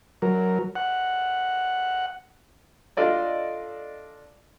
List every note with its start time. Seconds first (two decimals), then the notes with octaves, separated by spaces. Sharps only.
0.22 F#3 A#4
0.75 F#5
2.97 D4 F4 A4 D5 D#5